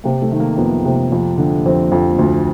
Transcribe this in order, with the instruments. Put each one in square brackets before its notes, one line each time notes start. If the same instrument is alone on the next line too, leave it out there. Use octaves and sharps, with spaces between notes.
[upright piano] C3 A#3
A3
D#3
A#3
F2 B3
C3
F2
D3
F2 C4
F2
D2